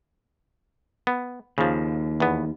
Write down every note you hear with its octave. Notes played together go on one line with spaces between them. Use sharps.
B3
D#2 C#3 F3
E2 B3